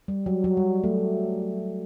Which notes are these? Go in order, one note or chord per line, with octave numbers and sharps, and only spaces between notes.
G3
F#3
F#3
G3
A3